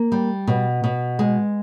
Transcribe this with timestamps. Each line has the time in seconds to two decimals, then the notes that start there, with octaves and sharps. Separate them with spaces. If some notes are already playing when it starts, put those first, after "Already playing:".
Already playing: A#3
0.12 G3
0.47 B2
0.84 B2
1.19 G#3